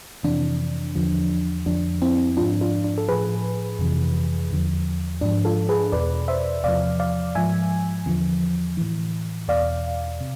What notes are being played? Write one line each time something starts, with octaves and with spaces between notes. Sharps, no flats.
F2 C3 E3 D4
E2 D3 F3
F2 D3 F3 D4
C4 E4
G#2 F3 D4 F4
D4 F4
D4
A4
A2 F3 G#4 B4
F2 C3 E3
E2 D3 F3
G#2 F3 D4
F4 A4
G#4 B4
E2 B2 B4 D5
C5 E5
E2 C3 F3 D5 F5
D5 F5
G#2 F3 E5 G#5
E2 D3 F3
A2 E3
E2 B2 D5 F5
C3